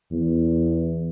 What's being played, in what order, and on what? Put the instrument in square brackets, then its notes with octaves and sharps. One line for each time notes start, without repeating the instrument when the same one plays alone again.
[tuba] E2